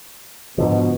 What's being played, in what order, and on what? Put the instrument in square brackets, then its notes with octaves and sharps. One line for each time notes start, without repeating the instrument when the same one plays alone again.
[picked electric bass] G#2 D3 F3 [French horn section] B2